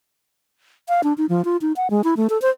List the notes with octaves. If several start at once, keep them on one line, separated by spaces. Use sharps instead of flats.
F5
D4
D#4
F3
F4
D#4
F#5
G#3
E4
A3
A4
C5